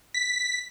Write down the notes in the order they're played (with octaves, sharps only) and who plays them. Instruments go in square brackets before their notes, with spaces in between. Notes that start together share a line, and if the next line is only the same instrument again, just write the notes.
[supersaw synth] B6